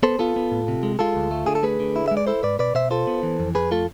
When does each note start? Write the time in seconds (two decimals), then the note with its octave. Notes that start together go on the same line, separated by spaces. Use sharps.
0.03 B3 A4 C5
0.19 B3 F4 A4
0.36 B3
0.52 A2
0.68 C3
0.83 G#3
0.99 G#3 F4 A4
1.16 D2
1.31 A3
1.46 D3 G#4
1.55 A4
1.63 A3 G#4 B4
1.80 D3
1.96 E4
2.08 G#3 E5
2.17 D5
2.27 E4 A4 C5
2.43 G#2 B4 D5
2.59 B2 B4 D5
2.75 B2 C5 E5
2.91 F4 A4 C5
3.07 B3
3.23 E3
3.40 F2
3.55 F2 G#4 B4
3.71 A3 F4 A4